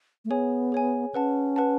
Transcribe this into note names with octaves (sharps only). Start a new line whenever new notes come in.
A3
B3 G#4 C#5 G#5
G#4 C#5 G#5
C#4 B4 F#5 A5
B4 F#5 A5